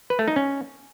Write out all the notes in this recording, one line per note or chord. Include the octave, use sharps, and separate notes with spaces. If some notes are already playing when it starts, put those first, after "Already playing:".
B4
A3
D#4
C#4